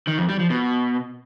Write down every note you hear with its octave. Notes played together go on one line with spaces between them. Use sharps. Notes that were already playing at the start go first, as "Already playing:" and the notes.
D#3
F2
G3
F3
B2